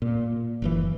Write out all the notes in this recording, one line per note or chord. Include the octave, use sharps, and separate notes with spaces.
A#2
F#1 C3 E3